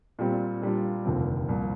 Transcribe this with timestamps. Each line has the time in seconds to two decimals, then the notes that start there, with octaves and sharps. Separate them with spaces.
0.19 A#2 G3 C4
0.62 A#2 G3 D4 F4
1.05 F1 D#2 D3 F3 C4
1.48 C2 A#2 F3 A#3